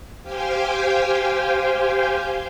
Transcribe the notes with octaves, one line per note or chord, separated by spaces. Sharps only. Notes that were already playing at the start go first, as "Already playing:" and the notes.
G4 C5 F5 G5 G#5